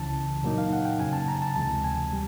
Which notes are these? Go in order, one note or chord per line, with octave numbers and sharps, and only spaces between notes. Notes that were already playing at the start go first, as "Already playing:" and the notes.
Already playing: C#2 C#3 E3 A5
A#2 F#3 A#3 D#4
F5
F#5
G5
F#2 C#3 F#3 G#5
A5
A#5
A5
D2 C3 E3 G#3 A5
G#5
G3